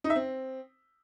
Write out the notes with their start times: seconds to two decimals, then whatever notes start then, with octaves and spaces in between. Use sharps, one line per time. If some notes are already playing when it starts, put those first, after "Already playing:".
0.04 D#4
0.10 E5
0.16 C4